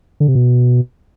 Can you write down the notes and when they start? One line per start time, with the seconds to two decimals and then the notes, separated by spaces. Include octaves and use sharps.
0.20 D3
0.28 C3
0.35 B2